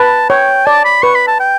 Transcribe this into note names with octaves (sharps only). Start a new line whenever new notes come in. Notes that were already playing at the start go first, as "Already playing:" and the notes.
Already playing: B4 A5
C#5 G5
D5 A5
B5
B4 C#6
B5
A5
G5